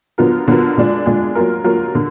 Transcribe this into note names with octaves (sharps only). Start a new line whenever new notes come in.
D3 F#3 B3 F4 A#4
D3 F#3 B3 F4 A#4
D3 G#3 D4 F4
D3 G#3 D4 F4
F#3 A#3 F4 A#4
F#3 A#3 F4 A#4
D3